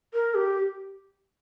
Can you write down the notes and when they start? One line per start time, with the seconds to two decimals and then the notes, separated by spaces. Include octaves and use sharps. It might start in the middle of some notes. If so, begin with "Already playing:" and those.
0.14 A#4
0.35 G4